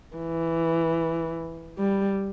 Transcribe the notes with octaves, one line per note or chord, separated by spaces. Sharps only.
E3
G3